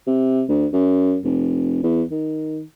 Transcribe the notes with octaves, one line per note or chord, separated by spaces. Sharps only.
C3
D2
F#2
F1
E2
D#3